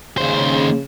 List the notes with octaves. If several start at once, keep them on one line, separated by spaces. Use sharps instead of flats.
D#2 C#3 C5